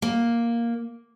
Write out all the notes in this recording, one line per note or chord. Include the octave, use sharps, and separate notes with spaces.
A#3